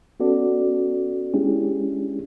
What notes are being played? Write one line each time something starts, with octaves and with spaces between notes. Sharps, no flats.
B3 C#4 F#4 A4 D5
G#3 C#4 D4 E4 G4 G#4